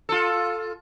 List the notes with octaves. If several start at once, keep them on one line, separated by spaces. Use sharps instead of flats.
F4 A4